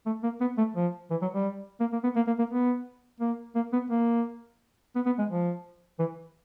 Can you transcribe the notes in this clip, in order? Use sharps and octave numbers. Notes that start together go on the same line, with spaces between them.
A3
A#3
B3
A3
F3
E3
F#3
G3
A#3
A#3
B3
A#3
A#3
A#3
B3
A#3
A#3
B3
A#3
B3
B3
G#3
F3
E3